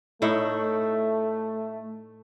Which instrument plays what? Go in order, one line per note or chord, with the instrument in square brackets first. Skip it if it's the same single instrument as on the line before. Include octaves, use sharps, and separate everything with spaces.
[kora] A2 D#4 E4 [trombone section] A3